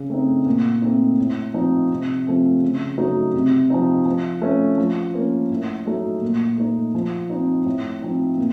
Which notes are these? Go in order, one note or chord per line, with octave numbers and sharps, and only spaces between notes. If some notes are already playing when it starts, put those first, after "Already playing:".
Already playing: C#3
A3 C4 D#4
A#2
A3 C4 D#4
A2
F3 C4 D#4
C3
F3 A3 C4
C#3
F#3 A3 D#4
C3
F3 C4 D#4
F3
A3 C#4
F3
A#3 C#4
A2
F#3 A3 D#4
A#2
A3 D#4
F3
C4 D#4
A2
F3 C4 D#4
A#2